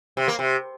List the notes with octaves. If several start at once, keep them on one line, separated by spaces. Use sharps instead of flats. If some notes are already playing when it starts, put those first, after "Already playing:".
C3
A#3
C3